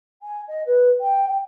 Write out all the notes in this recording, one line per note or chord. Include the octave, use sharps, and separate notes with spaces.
G#5
D#5
B4
G5
G5